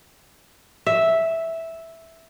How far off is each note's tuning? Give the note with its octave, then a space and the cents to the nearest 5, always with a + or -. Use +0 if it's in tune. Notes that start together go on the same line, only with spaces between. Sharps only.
E5 -5